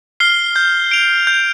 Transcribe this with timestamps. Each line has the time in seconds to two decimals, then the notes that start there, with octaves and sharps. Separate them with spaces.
0.20 F6 C7 G7
0.56 G6
0.91 D7 F7
1.27 G6